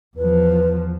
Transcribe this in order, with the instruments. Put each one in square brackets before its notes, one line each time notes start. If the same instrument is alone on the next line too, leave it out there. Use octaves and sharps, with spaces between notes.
[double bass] E2 F3 [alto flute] B4